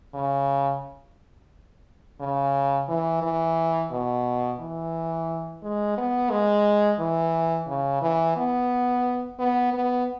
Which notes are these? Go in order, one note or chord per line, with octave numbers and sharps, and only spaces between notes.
C#3
C#3
E3
E3
B2
E3
G#3
B3
G#3
E3
C#3
E3
B3
B3
B3